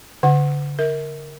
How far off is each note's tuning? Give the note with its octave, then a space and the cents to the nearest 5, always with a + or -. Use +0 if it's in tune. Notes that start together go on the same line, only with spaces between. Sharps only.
D3 -35 F#5 +0
A#4 +0 E5 -35